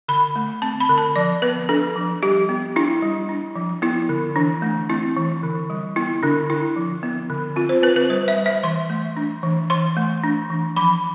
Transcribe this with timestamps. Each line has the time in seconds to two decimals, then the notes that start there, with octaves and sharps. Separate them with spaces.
0.08 D3 B5
0.36 A3
0.62 C4 A5
0.80 B5
0.89 D3
0.98 A5
1.16 F3 D5
1.42 B3 B4
1.69 D4 A4
1.96 F3
2.23 G3 G4
2.49 B3
2.76 D4 E4
3.02 G3
3.29 D4
3.56 F3
3.82 B3 E4
4.09 D3
4.36 E3 D4
4.62 A3
4.89 C4 E4
5.17 E3
5.43 D3
5.70 G3
5.96 B3 E4
6.23 D3 D4
6.50 D3 E4
6.76 F3
7.03 B3
7.30 D3
7.56 C4 F4
7.69 C5
7.83 C4 B4
7.96 B4
8.10 G3 C5
8.28 E5
8.37 G3
8.46 E5
8.63 E3 C6
8.90 A3
9.17 D4
9.43 E3
9.70 E3 C6
9.97 A3
10.24 D4
10.50 E3
10.76 F3 B5